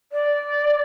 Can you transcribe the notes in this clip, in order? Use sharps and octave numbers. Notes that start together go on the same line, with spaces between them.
D5